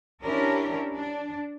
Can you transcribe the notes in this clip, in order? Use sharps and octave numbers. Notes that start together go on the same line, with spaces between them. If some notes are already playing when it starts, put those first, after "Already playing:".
C#4 D4 E4 G4 A#4
D4